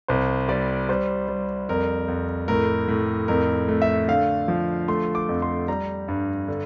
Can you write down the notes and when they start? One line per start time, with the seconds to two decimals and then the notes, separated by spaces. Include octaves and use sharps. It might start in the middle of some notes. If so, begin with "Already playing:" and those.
0.08 C2 C5
0.49 G3 D5
0.89 G3 C5
1.28 G3
1.69 F2 A#4
2.08 F2
2.48 A2 A#4
2.88 A2
3.28 F2 A#4
3.68 A3
3.82 E5
4.08 D3 F5
4.48 F3
4.88 A3 C6
5.15 D6
5.29 F2
5.42 C6
5.68 G3 A#5
6.08 G2
6.48 D3